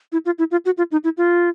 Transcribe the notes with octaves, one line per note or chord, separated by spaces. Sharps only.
E4
F4
E4
F4
F#4
F4
D#4
E4
F4